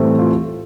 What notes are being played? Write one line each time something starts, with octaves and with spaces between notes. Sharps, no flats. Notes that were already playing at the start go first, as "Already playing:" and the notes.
Already playing: A2 E3 G3 A3 C4
F4